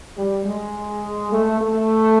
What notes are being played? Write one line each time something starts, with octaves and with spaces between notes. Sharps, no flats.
G3
G#3
A3
A3